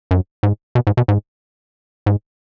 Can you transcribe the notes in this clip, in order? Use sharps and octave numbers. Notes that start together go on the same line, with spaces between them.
F#2
G#2
B2
G#2
B2
G#2
G#2